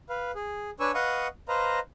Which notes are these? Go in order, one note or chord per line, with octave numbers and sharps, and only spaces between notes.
B4 F5
G#4
D4 B4 C#5 G#5 C#6 E6
B4 D#5 F5 F#5 C#6 D#6
B4 C5 D#5 F5 A#5